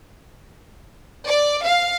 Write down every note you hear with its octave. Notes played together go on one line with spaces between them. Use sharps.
D5
F5